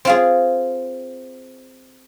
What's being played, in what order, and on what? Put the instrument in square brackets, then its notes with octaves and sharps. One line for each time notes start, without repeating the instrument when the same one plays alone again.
[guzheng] C4 F4 G#4